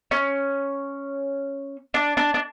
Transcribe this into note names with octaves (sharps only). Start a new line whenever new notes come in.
C#4
D4
D4
D4